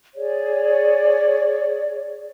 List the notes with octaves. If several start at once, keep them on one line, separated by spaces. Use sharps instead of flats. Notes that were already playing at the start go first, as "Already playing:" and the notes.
G#4 C#5 D5